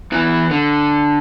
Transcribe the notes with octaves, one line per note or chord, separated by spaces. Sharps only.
E2 E3
D3